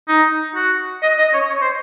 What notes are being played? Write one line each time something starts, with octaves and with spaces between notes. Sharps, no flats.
D#4
F#4
D#5
D#5
C#5
C#5
C5